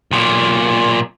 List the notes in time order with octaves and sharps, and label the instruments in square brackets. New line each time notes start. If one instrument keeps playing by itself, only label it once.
[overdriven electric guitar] B1 A#2